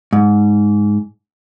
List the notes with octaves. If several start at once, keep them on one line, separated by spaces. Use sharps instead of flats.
G#2